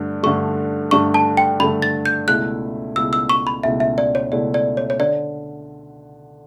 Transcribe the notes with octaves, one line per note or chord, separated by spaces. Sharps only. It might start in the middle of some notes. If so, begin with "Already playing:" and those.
Already playing: G2 D3 A3
G2 D3 A3 C#6
G2 D3 A3 C#6
A5
G5
G2 D3 A3 B5
A6
G6
C#2 B2 A3 E4 F#6
C#2 B2 A3 E4 E6
E6
C#6
B5
C#2 B2 A3 E4 E5
E5
D5
C#5
C#2 B2 A3 E4 D5
D5
C#5
C#5
D3 D5